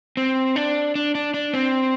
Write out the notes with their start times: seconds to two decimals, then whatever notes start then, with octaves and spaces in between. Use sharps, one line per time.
0.17 C4
0.56 D4
0.95 D4
1.15 D4
1.34 D4
1.54 C4